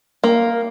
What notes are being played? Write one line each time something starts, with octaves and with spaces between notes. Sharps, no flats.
A#3